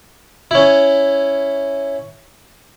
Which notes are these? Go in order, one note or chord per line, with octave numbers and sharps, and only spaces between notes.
C#4 E4